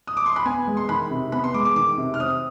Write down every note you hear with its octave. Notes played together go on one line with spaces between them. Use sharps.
D#6
D6
C6
B5
B3 G#5
G#3
C6
D#3 B5
C3
B3 B5
C6
G#3 D6
D6
D#3 D6
C3
F6
C4 D#6